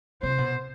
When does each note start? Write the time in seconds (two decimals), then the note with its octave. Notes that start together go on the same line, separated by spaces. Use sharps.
0.22 C3 C5
0.38 B2